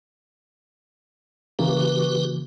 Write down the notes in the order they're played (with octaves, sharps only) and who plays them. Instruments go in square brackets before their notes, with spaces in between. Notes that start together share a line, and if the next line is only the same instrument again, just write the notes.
[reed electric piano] C#3 E3 A#3 [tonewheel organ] F#4 G4 B4